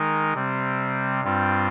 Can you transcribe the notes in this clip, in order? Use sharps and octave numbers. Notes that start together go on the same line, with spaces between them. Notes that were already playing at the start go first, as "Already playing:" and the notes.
Already playing: D#3 G#3 D#4 A#4
C3 G3 C4
G2 G3 C4 F4